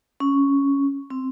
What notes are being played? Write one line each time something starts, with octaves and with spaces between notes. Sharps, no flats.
C#4
C4